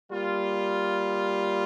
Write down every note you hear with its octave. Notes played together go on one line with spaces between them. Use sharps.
G3 A#3 F4